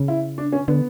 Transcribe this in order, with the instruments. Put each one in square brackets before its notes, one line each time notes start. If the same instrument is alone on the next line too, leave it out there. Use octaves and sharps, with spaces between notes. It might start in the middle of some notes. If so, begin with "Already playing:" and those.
Already playing: [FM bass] C#3
[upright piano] E4
D4
C#4
[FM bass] D3 [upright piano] B3